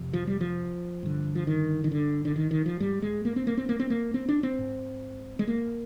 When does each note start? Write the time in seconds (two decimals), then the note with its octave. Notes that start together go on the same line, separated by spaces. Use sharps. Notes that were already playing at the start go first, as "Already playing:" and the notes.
Already playing: F2 C3
0.13 F3
0.27 G3
0.41 F3
1.03 G2 D3
1.35 F3
1.47 D#3
1.84 D#3
1.92 D3
2.25 D3
2.36 D#3
2.51 D#3
2.66 F3
2.80 G#2 G3
3.02 G#3
3.25 A#3
3.36 C4
3.47 A#3
3.57 C4
3.69 A#3
3.79 C4
3.90 A#3
4.14 C4
4.29 D4
4.43 C4
4.59 G#2
5.39 G#3
5.47 A#3